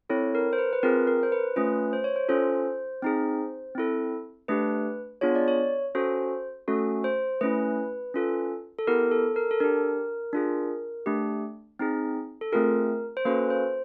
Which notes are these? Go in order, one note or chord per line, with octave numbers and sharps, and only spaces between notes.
C4 E4 A4 C#5
A#4
C5
B4
B4
C4 F4 G#4 A#4
A#4
C5
B4
A3 C#4 F4 B4
C5
C#5
C5
C#4 F4 A4 C5
C4 D#4 G#4
C4 E4 A4
A3 D4 G4 B4
B3 D4 F4 G#4 C#5
D5
C#5
C#4 F#4 A4 C5
A3 C#4 F#4 A4
C5
A3 C#4 E4 B4
C#4 F4 A4
A4
B3 E4 G4 A#4
A4
A#4
A4
D4 G4 A#4
D4 F4 G#4
A3 D4 G4
C4 D#4 G#4
A4
A3 C4 F4 G#4 A#4
C5
A#3 C#4 F#4 A4 B4
C5